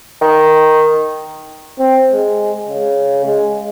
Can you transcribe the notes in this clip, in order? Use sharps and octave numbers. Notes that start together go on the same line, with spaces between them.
D#3
C4
G#3
C#3
G#3